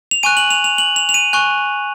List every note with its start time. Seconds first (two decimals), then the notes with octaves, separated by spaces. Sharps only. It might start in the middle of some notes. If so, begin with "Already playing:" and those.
0.11 F7
0.23 G#5 C#6 F#6 D#7
0.37 F#7
0.50 F7
0.64 F7
0.78 F#7
0.96 F7
1.09 F7
1.14 D#7
1.33 G#5 C#6 F#6